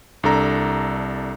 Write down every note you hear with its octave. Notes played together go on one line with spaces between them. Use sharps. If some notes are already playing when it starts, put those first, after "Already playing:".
C2 D4 A4 A#5